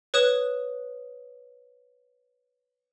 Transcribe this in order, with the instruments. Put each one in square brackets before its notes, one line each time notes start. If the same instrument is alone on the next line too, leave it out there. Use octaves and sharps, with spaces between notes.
[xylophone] B4 C#5 D#6 F#6 E7